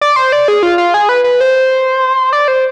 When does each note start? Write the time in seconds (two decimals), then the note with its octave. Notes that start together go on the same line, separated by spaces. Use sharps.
0.01 D5
0.16 C5
0.32 D5
0.48 G#4
0.63 F4
0.78 F4
0.94 G#4
1.09 B4
1.24 B4
1.41 C5
2.33 D5
2.48 C5